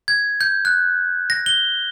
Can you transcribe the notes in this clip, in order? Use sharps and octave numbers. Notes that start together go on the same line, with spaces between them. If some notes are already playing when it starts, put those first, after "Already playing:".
G#6
G6
F#6
A#6
G7